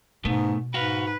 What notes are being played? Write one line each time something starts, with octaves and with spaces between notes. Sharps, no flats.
G#2 B2 A3 B3
G#2 F#4 B4 F5